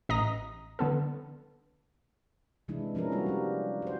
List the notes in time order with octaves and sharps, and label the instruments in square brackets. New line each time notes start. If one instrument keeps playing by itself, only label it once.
[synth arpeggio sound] A1 D#5 A#5 A#6
D3 B3 A4
[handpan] C3 E3 G#3 D4 E4
F3 C#4 D4 E4 A#4
G3 A#3 F#4
G3 G4
F#4 C5